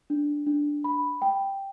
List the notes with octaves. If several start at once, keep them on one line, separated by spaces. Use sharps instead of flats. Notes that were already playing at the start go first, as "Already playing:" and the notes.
D4
D4
B5
G5